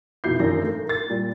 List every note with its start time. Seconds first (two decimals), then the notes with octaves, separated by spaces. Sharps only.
0.24 F1 B2 E4 G6 C7
0.40 G#1 F#2 E3 D4 A#4 A#6
0.62 A3
0.85 A#4 A6
1.09 A#2 G3